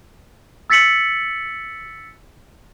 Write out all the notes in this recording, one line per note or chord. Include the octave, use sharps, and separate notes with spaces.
E6 A6 B6 C#7 F#7